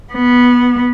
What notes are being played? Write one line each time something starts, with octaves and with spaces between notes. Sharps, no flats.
B3